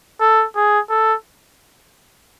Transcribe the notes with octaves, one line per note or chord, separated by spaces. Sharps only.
A4
G#4
A4